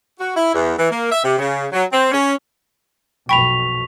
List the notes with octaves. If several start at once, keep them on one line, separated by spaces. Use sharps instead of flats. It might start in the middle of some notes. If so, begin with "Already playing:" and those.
F#4
E4
E2
E3
A#3
E5
C3
C#3
F#3
C4
C#4
B1 F2 B2 G5 B5 C#6 B6 F7